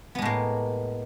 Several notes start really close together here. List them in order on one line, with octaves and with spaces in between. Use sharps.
B3 G#3 A2 A#3